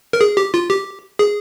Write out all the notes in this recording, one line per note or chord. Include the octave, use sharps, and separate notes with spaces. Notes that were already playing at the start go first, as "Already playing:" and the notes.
A#4
G#4
G4
F4
G4
G#4